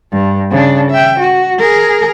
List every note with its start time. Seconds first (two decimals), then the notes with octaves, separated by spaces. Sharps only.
0.12 G2
0.51 C#3 D4
0.91 E5 G5
1.19 F#4
1.59 G#4 A#4